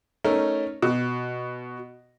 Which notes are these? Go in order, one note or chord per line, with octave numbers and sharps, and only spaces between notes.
A3 C#4 D#4 A#4
B2